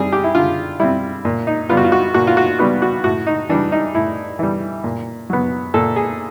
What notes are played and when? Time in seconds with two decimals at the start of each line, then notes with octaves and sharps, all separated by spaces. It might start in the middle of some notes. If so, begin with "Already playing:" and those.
Already playing: G3 C4 G#4
0.12 G4
0.24 E4
0.35 D3 F4
0.80 G3 C4 E4
1.25 A#2
1.47 D#4
1.69 G3 B3 F4
1.77 F#4
1.84 F4
1.92 F#4
2.14 A#2 F#4
2.27 F4
2.37 F#4
2.59 G3 B3 F#4
2.82 F#4
3.04 A2 F#4
3.27 D#4
3.49 E3 G3 D4
3.72 D#4
3.94 A2 E4
4.39 E3 G3
4.84 A#2
5.30 F#3 B3
5.74 A#2 A4
5.96 G#4